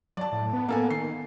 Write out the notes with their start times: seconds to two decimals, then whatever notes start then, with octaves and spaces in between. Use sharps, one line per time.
0.17 F#3 D5 A5
0.32 A2
0.53 B3
0.69 A#3 A4 G#5
0.90 D#3 C7